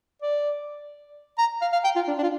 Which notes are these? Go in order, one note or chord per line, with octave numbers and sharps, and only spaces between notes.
D5
A#5
F5
F5
G5
F4
D4
D4
F4